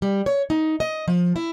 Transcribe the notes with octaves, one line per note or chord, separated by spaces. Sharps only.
G3
C#5
D#4
D#5
F3
E4